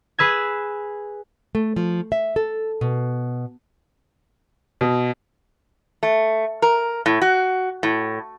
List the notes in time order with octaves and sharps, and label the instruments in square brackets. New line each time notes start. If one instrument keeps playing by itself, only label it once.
[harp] G#4 B4 E6 G#6
[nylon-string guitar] A3
F3
E5
A4
B2
[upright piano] B2
[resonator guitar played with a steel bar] A3
A#4
A2
F#4
A2